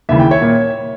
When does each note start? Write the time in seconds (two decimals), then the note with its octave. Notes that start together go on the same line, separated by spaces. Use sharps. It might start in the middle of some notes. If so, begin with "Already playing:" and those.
0.09 D#2 C#3 E3 E5
0.19 G5
0.31 C#5 E5
0.41 A#2